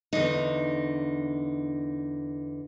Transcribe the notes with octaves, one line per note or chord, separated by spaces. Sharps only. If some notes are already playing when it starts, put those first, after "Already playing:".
E2 D3 D#4